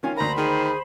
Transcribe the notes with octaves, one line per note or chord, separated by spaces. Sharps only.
D#3 C#4 F4 G#5
D2 A#3 C5 A#5 B5
D#3 G#4